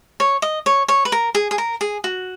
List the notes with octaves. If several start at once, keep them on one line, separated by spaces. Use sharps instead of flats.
C#5
D#5
C#5
C#5
B4
A#4
G#4
G#4
A#4
G#4
F#4